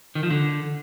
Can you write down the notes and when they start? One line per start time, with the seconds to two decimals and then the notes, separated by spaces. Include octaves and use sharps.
0.15 D#3
0.23 F3
0.31 D3